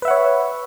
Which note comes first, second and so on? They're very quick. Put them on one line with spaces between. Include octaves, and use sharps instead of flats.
B4 E5 F#5 C#5